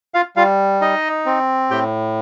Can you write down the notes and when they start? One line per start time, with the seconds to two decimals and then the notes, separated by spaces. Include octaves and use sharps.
0.14 F4 F5
0.36 G3 F4 F5
0.81 D#4 D#5
1.26 C4
1.71 A2 G4 G5